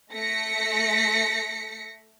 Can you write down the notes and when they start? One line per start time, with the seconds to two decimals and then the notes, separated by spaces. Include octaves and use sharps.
0.14 A3 A#6 B6 C#7